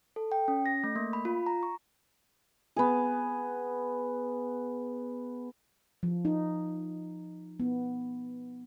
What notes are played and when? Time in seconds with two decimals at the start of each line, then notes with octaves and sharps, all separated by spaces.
0.16 A4
0.32 G5
0.48 C#4
0.66 A#6
0.84 A3
0.96 A#3
1.13 B5
1.25 F4
1.46 A#5
1.63 C#6
2.76 B3 G#4
6.03 F3
6.25 D#4
7.60 B3